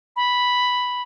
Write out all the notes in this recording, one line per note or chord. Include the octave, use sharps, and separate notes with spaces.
B5